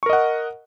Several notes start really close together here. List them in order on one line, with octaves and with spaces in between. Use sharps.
C#6 A#4 D#5 F#5